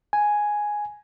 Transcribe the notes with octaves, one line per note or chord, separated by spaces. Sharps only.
G#5